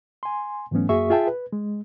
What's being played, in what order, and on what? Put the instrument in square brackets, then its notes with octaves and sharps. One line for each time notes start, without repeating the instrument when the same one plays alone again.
[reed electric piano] G#5 C6
G#2 E3 F#3 A3 B3 C#4
F#2 A#3 F#4 G#4 E5 C#6
F4 G#4 E5 G5 A5
B4
G#3